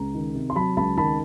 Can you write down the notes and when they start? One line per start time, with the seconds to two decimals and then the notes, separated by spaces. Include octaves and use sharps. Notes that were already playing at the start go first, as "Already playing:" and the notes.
Already playing: C#2 A#5
0.14 D#3
0.35 C3
0.50 C6
0.56 F#3 A5 B5
0.77 C#2 A5 B5
0.97 D#3 A5 B5